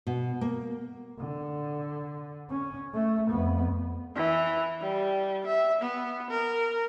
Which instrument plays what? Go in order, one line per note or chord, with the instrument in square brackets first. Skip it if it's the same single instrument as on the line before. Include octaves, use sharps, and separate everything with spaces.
[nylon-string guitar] B2
A#3
[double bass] D3
C#4
A3
F2 B3
[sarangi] E3
G3
E5
B3
A#4